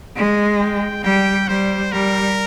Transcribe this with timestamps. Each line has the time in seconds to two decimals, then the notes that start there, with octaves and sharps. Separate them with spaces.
0.16 G#3
0.60 G5
1.03 G3 G5
1.48 G3 C5
1.92 G3 A#4